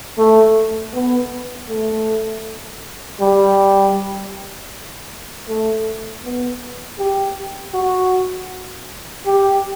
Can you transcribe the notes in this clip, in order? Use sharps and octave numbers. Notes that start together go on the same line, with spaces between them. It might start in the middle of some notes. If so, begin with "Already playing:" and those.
A3
B3
A3
G3
A3
B3
G4
F#4
G4